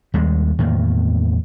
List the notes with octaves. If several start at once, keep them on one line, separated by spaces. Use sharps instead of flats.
D#2 G3 G#3
E2 A2 D#3 A#3